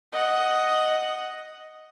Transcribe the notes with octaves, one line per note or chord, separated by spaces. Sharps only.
D#5 F#5